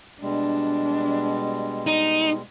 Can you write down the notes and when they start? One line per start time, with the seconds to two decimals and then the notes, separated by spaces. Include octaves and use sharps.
0.21 B2 G3 G#3 D4
1.87 D#4